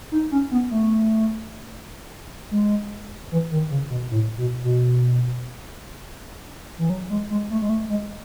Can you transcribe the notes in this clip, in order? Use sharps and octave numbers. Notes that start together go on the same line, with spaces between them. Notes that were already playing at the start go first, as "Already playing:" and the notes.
D#4
C#4
B3
A3
G#3
E3
D#3
C#3
B2
A2
B2
B2
E3
F#3
G#3
G#3
A3
G#3
A3
G#3